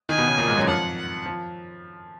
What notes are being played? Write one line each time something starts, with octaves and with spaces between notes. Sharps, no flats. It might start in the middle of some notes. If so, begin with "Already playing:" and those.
D#3 D#4 G#5
B2 B3
C#3
A#2 A#3
G#2 G#3
F#2 F#3
F2 F3 F#5
F#5
F3